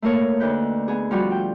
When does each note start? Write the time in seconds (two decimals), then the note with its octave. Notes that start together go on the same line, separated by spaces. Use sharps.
0.02 A3 A#3 A#4 C#5
0.40 D2 D#4 B4 G6
0.88 B3 G#4
1.11 F3 G3 F#4 B5
1.31 G5